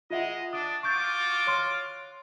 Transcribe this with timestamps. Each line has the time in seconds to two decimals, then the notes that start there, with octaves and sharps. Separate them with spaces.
0.10 G#3 F4 D#5 E5 F#5
0.53 D4 D#6
0.83 F4 F#4 C#6 D6 G6 A6
1.47 C#5 C6 F6